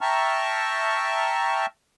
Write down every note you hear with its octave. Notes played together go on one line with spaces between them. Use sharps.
E5 G5 A5 A#5 C#6 F6